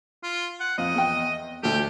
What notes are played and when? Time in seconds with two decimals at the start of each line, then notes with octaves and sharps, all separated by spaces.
0.23 F4
0.60 F#5
0.78 F2 D#5
0.94 E2 G5
1.63 D2 A3 G4